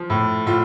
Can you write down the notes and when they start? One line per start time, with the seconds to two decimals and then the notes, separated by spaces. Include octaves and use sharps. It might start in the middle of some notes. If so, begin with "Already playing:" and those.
Already playing: F3
0.10 A2
0.46 A2 F4